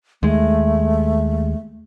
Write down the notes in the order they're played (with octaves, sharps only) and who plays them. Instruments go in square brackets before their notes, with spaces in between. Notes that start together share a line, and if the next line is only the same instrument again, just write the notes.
[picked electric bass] D#2 G#3 [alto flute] A3